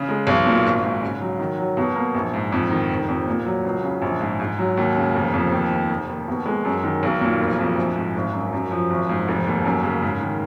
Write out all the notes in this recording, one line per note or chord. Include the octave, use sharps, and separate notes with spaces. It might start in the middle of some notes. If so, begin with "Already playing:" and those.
Already playing: C#3
G#3
B1
A#2
G#1
G#2
C#3
F#3
D#3
F#3
B2
A#3
A#1
G#2
F2
D#3
F1
F2
A#2
F#3
C#2
C#3
A#1
G#2
G#2
F#3
D#2
C#3
F1
F2
D#2
D#3
F1
D#2
B2
G#3
F#2
D#3
B1
A#2
F1
F2
A#1
G#2
G#1
F#2
F#2
F3
G#1
G#2
F1
D#2
F#2
C#3
G#2
D#3